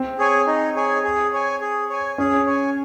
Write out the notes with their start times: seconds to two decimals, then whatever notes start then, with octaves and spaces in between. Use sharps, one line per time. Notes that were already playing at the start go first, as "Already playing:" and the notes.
Already playing: C4
0.19 G#4 C#5 G#5
0.47 D#4
0.76 G#4 C#5 G#5
1.04 G#4
1.33 C#5 G#5
1.61 G#4
1.89 C#5 G#5
2.18 C#4 G#4
2.47 C#5 G#5